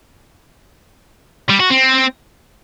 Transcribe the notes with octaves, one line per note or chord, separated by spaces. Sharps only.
G3
F#4
C4